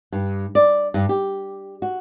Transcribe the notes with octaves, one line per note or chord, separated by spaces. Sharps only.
G2
D5
G2
G4
F#4